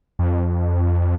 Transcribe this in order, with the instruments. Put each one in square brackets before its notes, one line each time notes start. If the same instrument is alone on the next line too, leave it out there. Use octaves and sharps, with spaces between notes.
[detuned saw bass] F2